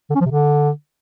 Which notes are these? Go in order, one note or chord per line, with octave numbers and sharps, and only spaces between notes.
D3
C#4
F3
C3
D3